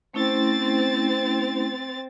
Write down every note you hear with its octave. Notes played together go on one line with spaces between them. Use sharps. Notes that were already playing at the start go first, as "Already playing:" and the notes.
A3 C4 C#4 E4 A6